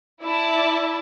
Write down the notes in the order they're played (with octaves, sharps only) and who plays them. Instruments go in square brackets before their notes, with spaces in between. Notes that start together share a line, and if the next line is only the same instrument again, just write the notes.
[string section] E4 [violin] D5 A5